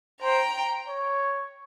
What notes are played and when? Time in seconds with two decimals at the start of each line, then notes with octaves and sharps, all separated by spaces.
0.22 C5 G5 A#5
0.88 C#5